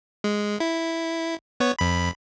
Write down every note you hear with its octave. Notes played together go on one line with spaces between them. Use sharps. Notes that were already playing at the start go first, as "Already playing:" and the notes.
G#3
E4
B3 C#5
F2 B5